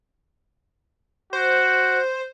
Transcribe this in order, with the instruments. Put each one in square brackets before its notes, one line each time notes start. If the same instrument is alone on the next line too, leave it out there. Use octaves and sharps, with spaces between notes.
[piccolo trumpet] F#4 [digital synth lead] C5